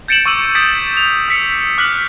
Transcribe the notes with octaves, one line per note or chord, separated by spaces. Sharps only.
G6 A6 C#7 D7 E7 F#7
C#6 D6 E6 D#7 F#7
D#6 G6 A6 B6 D7
F7
E6 B6 C#7
D6 F6 F#6 B6 F#7